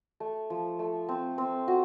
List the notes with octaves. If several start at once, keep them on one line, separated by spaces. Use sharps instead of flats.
A3
F3
A3
C4
C4
F#4